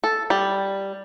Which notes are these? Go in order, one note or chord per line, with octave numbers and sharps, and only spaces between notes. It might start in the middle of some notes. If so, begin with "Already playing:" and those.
A4
G3